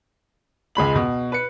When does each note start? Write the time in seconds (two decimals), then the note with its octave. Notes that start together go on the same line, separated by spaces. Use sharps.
0.75 C#2 G#3 B5 F#7
0.95 B2
1.32 B4 C#7